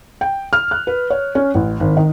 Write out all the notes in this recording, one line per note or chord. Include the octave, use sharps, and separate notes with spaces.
G5
F6
F#6
B4
C#5
C#4
A1
G#1
D#3